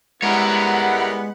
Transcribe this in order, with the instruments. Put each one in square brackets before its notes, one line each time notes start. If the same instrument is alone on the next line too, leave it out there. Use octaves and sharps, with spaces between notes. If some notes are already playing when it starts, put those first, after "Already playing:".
[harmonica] G3 B3 E4 [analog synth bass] G#3 [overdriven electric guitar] A#4 C#5 [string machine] F#5 B5